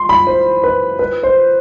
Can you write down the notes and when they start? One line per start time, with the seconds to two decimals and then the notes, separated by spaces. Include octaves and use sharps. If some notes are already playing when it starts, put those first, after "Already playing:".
Already playing: C6
0.09 B5
0.27 C5
0.64 B4
0.99 B4
1.23 C5